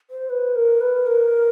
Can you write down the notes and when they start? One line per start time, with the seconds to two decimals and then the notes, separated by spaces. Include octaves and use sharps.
0.11 C5
0.30 B4
0.55 A#4
0.81 B4
1.07 A#4